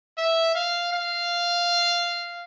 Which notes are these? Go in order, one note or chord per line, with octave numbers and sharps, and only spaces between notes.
E5
F5
F5